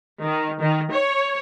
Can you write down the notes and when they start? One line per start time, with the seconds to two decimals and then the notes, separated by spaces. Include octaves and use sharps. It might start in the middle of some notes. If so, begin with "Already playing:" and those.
0.22 D#3
0.61 D#3
0.91 C#5